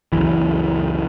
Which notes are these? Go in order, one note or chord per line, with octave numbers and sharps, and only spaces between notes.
C#2 F#2 E3